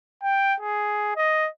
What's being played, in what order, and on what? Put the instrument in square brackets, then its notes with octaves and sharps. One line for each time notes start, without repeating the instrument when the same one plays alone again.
[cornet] G5
G#4
D#5